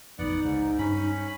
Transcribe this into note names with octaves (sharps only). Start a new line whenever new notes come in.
A1 F2 B3 D#4 D5 F#5
C#2 G#2
G2 C#4 B5